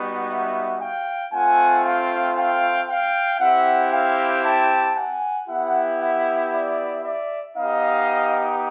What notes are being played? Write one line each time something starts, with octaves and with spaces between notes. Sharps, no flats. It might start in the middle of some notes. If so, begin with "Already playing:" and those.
Already playing: G3 B3 D#4 F#4
E5 F#5
F5 G5
A3 C4 F4 F#5 G#5
F5 G5
F5 G5
F5 G5
C4 E4 G4 E5 F#5
F5 G5
G5 A5
F#5 G#5
B3 E4 G4 E5 F#5
E5 F#5
D5 E5
D5 E5
B3 D#4 G4 D#5 F5